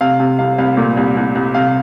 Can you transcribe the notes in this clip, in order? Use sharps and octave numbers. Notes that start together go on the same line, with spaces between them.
C3 F5
C3
C2 F5
C2 F5
A#2
C2
C2
C2
C3 F5